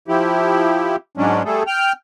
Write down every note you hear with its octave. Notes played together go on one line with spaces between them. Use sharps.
F3 E4 G4
G#2 F#3 G#3 C#4 D4
G3 A3 G#4 A4
G5 F6